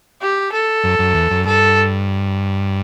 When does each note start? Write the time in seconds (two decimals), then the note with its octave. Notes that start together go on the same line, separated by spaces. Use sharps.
0.21 G4
0.52 A4
0.84 F#2
0.99 F#2
1.14 E2
1.31 F#2
1.45 G2 A4